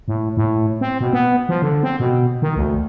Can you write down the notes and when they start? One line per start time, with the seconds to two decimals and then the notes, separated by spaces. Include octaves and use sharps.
0.08 A2
0.37 A2
0.81 C4
1.01 B2
1.13 B3
1.49 F3
1.62 D3
1.83 C4
2.00 B2
2.42 D#3
2.57 D2